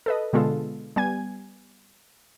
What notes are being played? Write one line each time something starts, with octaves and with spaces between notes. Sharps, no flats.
A4 B4 D#5
B2 D3 G#3 B3 F4 A4
G3 B3 G#5 G#6